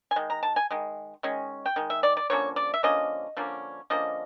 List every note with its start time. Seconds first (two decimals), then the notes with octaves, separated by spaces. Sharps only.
0.11 G#5
0.16 D#3 G#3
0.30 A#5
0.43 A5
0.56 G#5
0.71 D#3 G#3
1.23 D#3 G#3 C#4
1.66 G5
1.76 D#3 G#3
1.90 E5
2.03 D5
2.17 D5
2.30 D3 F3 A#3 C#4 C#5
2.56 D5
2.74 E5
2.83 D3 F3 A#3 C#4 D#5
3.37 D3 F3 A#3 C#4
3.90 D3 F3 A#3 C#4 D#5